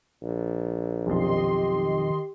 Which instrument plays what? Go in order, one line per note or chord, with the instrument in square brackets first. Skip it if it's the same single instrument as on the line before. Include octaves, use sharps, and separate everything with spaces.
[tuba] A#1
[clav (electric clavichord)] B1 F2 [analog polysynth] D#3 D#5 C6 [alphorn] G4